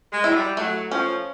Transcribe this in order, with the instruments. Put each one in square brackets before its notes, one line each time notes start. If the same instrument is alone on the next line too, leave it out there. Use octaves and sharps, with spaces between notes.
[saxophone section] G#3
[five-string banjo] E4
[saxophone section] F#3
G3
[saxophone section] F#3 [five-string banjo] A3
[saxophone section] F3 [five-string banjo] C#4